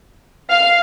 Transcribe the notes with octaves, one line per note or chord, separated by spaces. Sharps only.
F5